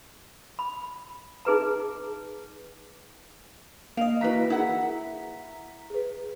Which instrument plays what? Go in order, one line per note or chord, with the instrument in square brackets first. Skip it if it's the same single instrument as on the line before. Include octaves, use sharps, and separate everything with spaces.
[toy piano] B5
D#4 G#4 B4 A#5
[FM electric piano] A#3 D#5 [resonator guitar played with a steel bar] F5
[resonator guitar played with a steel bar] E3 B4 [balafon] A#3 E4 F#4 [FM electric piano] A#5 B6
[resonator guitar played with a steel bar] E4 F#5 [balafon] G#4 A#4
[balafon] G#4 B4